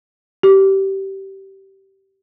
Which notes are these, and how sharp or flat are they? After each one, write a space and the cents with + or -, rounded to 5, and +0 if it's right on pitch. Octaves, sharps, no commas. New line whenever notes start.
G4 -20